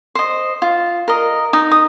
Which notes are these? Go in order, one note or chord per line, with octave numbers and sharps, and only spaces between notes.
C5 D#5
F4
A#4 D#5
D#4 D#6
D#6